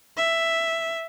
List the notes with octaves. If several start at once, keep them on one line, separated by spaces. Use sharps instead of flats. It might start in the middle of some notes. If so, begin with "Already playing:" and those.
E5